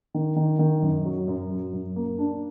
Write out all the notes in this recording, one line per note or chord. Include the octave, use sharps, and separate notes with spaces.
D#3
D#3
D#3
F#2
F#3
F#2
F#3
F#2
A#3
D4